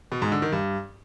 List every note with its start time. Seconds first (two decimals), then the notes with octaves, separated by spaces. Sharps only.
0.12 B2
0.22 G#2
0.32 D3
0.42 D#3
0.52 G2